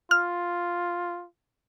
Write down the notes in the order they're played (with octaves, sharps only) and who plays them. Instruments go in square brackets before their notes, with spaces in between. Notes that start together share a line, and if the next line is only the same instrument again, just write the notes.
[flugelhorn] F4 [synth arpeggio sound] F6